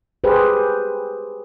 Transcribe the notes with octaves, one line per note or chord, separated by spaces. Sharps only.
G4 G#4 B4 C5